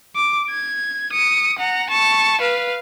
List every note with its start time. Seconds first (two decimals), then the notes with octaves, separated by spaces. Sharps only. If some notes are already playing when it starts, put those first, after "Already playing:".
0.16 D6
0.50 G#6
1.12 D#6 C#7
1.59 F#5 A#5
1.90 A5 C#6
2.41 B4 F5